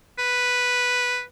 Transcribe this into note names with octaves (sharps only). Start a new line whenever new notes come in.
B4